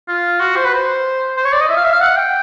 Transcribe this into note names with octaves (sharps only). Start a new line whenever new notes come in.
F4
F#4
C5
B4
C5
C5
C#5
D5
D#5
E5
F5
E5
F5
F#5
G5